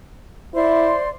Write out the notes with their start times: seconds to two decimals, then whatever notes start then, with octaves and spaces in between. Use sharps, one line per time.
0.54 E4 C5 D5 C6